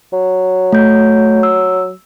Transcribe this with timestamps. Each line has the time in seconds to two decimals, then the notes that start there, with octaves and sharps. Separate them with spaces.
0.13 F#3
0.72 A3 G6
1.43 E6